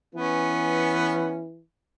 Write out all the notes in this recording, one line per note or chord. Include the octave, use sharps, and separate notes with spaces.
E3 B3 C#4